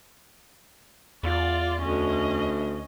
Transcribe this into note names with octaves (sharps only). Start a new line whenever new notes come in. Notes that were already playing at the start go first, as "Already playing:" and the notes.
E2 F4 D5
D2 C#4 D#5